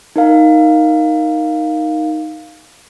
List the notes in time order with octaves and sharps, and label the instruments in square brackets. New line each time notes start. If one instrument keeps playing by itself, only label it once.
[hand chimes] D#4 A#4 F5